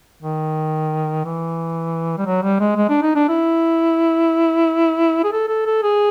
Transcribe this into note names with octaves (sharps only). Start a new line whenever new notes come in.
D#3
E3
G3
F#3
G3
G#3
G#3
D4
D#4
D4
E4
G#4
A4
A4
A4
G#4